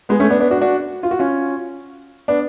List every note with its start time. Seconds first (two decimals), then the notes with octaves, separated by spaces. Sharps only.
0.09 G#3 B3
0.20 A3 C#4
0.30 B3 D4
0.40 B3 D4
0.51 D4 F#4
0.61 D4 F#4
1.03 F4
1.11 F#4
1.19 C#4 F4
2.28 B3 D4